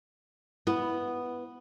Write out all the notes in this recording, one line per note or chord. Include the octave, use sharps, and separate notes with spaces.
B3 E4